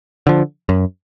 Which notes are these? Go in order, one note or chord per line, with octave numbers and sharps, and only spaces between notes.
D3 F3
F#2